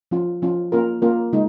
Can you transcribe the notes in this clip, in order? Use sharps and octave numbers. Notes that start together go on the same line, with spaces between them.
F3 C#4 F4
F3 C#4 F4
A#3 C#4 F4 A#4
A#3 C#4 F4 A#4
C#3 G#3 D#4